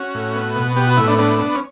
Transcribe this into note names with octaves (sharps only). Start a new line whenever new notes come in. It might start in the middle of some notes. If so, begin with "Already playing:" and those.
Already playing: C#4 F#4
A2
B3
B2
B3 G4
F#4
A2 E4
D4
B3 D4
B3
C#4